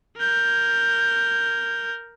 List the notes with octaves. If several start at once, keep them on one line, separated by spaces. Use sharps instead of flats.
A#4 G6